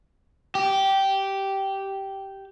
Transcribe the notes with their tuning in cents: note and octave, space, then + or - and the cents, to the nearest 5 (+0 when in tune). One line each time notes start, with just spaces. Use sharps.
G4 -10